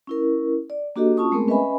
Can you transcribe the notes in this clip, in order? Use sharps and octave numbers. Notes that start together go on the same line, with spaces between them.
C#4 E4 A#4
D5
A#3 D4 F#4 G4 A4 D#5
C#4 F4 A5 C#6 D#6
G#3 A3 B3 C4 G#4 A#4
C#4 B4 D#5 E5 G#5 B5